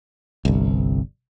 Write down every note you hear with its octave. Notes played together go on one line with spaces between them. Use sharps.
G1 C2